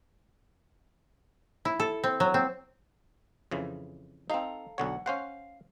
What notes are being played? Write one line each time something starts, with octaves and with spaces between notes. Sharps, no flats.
E4
A4
C4
F#3
C4
F2 C#3 E3
C4 D#4 A4 F5 A#5
B1 D3 C#5 F#5
C#4 C5 F5 F#5